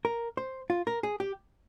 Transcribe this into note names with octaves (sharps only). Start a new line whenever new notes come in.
A#4
C5
F4
A#4
G#4
G4